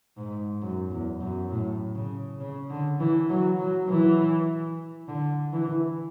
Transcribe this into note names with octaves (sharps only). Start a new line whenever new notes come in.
G#2
F#2
E2
F#2
A2
C#3
C#3
D3
E3
F#3
F#3
E3
D3
E3